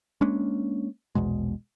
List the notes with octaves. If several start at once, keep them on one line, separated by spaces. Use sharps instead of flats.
G#3 A#3 C#4 D4
A#1 E2 B2 G#3